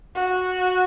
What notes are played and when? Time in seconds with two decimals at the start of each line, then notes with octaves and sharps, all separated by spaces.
0.15 F#4